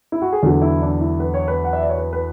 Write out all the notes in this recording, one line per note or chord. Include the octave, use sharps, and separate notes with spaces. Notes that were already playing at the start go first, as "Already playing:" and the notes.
E4
F#4
G#4
E2 D3 F#3 A4
E4
D4
E4
B4
C#5
B4
F#5
E5
D5
C#5
B4
B4